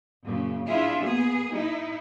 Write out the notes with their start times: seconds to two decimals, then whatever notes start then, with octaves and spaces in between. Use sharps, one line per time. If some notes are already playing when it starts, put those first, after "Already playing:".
0.23 F#2 A#2 C#3
0.66 D4 E4 F4 G#4 E5
1.01 A#3 B3 G#4
1.53 D#4 E4